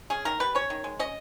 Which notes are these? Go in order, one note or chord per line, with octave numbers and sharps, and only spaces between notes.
C#4 G#4
D#3 A#4
G3 B4
C#4 C#5
D#3
G#3
C#4 D#5